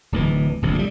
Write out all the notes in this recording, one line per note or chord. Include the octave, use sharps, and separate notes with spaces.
D1 D2 E3
D1 A#1 C3
C#3 G3